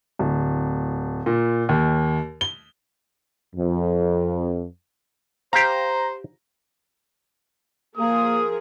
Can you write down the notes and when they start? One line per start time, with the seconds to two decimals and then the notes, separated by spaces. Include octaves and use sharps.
0.19 D1
1.26 A#2
1.69 D#2
2.41 G7
3.55 F2
5.53 G4 C5 F5 A#5
7.97 F3 A#3 G#4 A#4 D#6